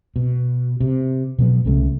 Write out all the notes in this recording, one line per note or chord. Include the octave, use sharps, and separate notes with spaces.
B2
C3
B2 F3 F#3 B3
C2 C#3 A3